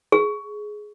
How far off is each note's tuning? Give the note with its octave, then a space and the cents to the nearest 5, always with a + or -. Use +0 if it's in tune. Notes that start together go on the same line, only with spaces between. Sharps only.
G#4 +15